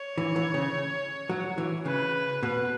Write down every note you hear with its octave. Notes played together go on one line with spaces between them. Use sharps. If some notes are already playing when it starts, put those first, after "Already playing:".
Already playing: C#5
E3
E3
C#3
F#3
E3
C#3 B4
B2 B4